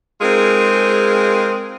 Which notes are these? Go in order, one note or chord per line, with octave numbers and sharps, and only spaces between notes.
G#3 C4 D#4 F4 G#4 A#4